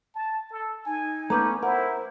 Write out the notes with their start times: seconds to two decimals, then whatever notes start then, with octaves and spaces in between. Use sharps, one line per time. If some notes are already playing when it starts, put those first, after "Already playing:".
0.15 A5
0.51 A4
0.86 D#4 G#5
1.30 A3 B3 C#4 B4 A#5 D6 G6
1.63 E4 A#4 C5 F#5